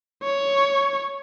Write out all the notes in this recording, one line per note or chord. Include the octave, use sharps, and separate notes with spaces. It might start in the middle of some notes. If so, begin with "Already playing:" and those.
C#5